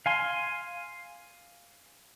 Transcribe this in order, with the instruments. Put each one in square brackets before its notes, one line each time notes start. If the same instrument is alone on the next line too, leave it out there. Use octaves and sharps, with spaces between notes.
[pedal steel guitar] F5 G#5 C6